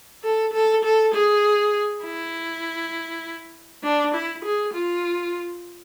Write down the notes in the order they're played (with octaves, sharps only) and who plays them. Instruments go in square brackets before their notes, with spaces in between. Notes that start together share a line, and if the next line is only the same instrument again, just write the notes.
[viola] A4
A4
A4
G#4
E4
D4
E4
G#4
F4